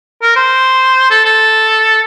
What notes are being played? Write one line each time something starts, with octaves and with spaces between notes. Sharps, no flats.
A#4
C5
A4
A4